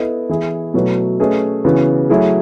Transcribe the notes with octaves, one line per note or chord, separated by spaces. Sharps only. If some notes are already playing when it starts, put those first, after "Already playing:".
Already playing: B3 E4 A4 D#5
E3 B3 E4 G#4
B2 F#3 A3 E4 B4
A3 C#4 G#4 B4 D#5
C#3 E3 B3 F#4
F#3 A3 E4 G#4